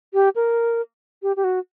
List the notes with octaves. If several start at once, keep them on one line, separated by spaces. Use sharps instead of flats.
G4
A#4
G4
G4
F#4